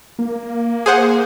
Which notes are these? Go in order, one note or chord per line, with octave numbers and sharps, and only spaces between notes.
A#3
G#4 C5 F#5